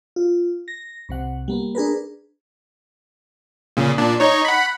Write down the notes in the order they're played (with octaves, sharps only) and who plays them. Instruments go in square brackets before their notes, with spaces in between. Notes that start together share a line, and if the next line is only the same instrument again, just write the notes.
[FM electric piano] F4
A#6
C2 C3 F#5
G3 A#3 B3
D4 G#4 A#4 B4
[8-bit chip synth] A#2 C#3
A#2 D4
D#4 C#5
F#5 B5